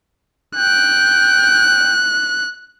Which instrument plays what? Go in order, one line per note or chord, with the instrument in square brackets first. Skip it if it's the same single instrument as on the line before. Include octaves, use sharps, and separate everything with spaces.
[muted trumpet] G5 [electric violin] F#6